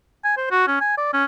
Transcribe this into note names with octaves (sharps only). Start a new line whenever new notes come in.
G#5
C5
F#4
C#4
G#5
D5
C#4